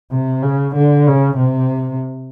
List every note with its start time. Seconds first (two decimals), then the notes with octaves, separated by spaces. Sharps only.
0.12 C3
0.43 C#3
0.76 D3
1.07 C#3
1.38 C3